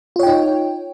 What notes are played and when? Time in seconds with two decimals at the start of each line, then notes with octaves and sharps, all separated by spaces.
0.16 F4
0.19 C#5
0.23 G5
0.27 D#4